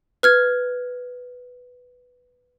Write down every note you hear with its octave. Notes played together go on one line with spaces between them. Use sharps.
B4 F6 G#6